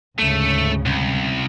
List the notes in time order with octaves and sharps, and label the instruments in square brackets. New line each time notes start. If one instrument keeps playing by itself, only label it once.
[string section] D2 G#2 C#3 [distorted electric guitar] A3
[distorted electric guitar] C2